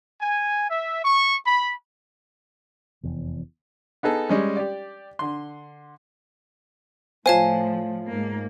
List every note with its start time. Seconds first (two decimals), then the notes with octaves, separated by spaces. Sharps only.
0.21 G#5
0.69 E5
1.04 C#6
1.45 B5
3.03 F1 E2
4.03 B3 D#4 G#4 A4
4.29 G3 G#3 C#4
4.57 G4 D5
5.19 D3 C6
7.26 A2 F3 F4 C5 C#5 F5 G#5 A5
8.07 G#2 A#3